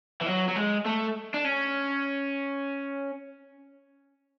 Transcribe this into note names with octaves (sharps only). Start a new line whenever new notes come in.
E3
F#3
F#3
G#3
A3
D4
C#4